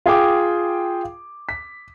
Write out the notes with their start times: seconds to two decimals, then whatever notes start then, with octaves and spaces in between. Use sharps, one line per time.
0.06 F4 G#4 G5 D6
1.49 B6